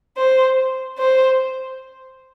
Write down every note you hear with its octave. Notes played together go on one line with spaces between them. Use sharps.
C5
C5